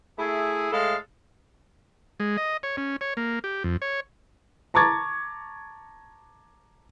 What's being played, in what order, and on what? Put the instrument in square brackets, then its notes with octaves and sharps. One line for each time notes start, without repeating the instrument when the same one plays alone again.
[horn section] A3 E4 G#4
A2 G#3 A4 F5
[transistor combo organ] G#3
D#5
C#5
C#4
C#5
A#3
G4
F2
C#5
[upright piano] A5 A#5 C#6 D6 G#6 A6